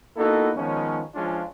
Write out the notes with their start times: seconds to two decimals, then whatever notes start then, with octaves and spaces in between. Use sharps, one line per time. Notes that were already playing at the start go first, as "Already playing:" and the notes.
0.17 A#3 B3 D#4 E4 F#4 A4
0.55 D#3 F3 G#3 B3 C#4
1.14 F3 G#3 C#4 D4 F4